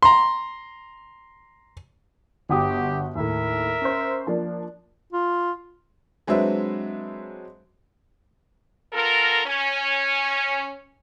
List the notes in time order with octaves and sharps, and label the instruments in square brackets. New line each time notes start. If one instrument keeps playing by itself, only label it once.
[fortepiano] A#5 C6
[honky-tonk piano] G1 F#4 D#6 [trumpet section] G4
[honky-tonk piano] D#2 A2 [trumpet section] A#4 E5
[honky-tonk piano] C#4 C5
F3 A#3 D4
[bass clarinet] F4
[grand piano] F#3 G#3 C4 D4 B4 E5
[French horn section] B3 F4 A4 A#4
C#4